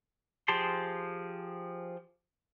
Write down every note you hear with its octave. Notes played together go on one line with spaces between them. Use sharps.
F3 G4 G#4 A5 C6